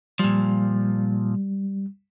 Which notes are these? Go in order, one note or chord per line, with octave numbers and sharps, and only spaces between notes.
A#2 F3 G3